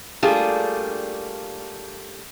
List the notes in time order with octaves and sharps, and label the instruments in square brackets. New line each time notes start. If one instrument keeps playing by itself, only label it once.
[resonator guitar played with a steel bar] G3 A3 A#3 D4 F4 G#4